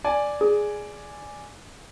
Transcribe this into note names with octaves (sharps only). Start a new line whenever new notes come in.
D5 G#5
G#4